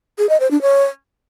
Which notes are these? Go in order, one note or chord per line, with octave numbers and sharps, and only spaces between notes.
G#4
D#5
C5
D4
C#5